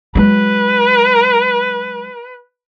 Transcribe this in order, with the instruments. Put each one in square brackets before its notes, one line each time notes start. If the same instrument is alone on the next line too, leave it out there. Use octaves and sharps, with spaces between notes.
[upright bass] F#3 G#3 [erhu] B4